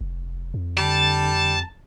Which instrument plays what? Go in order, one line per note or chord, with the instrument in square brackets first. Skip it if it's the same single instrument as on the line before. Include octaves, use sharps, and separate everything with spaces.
[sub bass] F1
F2
[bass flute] D3 [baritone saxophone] G3 [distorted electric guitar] A5